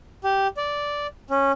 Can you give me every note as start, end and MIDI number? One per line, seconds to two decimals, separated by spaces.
0.24 0.48 67
0.57 1.07 74
1.30 1.52 61